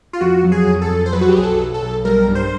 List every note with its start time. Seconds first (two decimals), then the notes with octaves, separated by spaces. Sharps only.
0.13 F4
0.21 F2 F#4
0.44 F#3
0.52 G#4
0.67 F2
0.82 A4
0.90 F2
1.06 C5
1.13 F#3 B4
1.21 F#4
1.29 G4
1.36 B1 G#4
1.43 A4
1.59 B1
1.74 A4
1.82 B1
2.05 G3 A#4
2.28 G2
2.35 C5